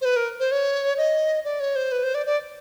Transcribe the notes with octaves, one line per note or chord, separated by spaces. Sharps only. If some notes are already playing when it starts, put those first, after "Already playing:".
C5
B4
A#4
C5
C#5
D#5
D5
C#5
C5
B4
C5
D5
D5